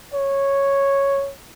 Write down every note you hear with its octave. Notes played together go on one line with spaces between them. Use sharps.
C#5